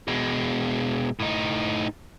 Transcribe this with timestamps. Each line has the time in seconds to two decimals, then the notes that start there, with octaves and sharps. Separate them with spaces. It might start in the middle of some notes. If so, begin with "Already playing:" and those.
0.08 B2 G#3
1.20 A2 D#4